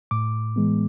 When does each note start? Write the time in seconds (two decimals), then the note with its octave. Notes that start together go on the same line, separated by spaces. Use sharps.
0.11 A2 D6
0.56 E3 G#3 B3